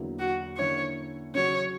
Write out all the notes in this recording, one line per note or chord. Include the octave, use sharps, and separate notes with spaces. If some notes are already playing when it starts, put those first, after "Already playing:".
Already playing: E2 D3 F#3 A#3 E4
F#4
D3 A#3 C#4 E4 C#5
C#3 F#3 C#4 F#4 C#5